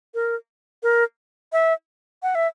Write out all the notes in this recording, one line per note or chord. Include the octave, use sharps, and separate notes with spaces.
A#4
A#4
E5
F#5
E5